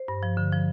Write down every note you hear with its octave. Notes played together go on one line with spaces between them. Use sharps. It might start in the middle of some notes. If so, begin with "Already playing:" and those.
Already playing: C5
G2
F3
D3
F3